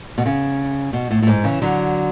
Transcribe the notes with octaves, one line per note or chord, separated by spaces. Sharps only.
B2
C#3
B2
A2
A2
G#2
C#3 E3
D3 F#3